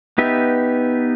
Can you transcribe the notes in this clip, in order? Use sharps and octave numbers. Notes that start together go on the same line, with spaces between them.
B3 D#4 G4 B4 E5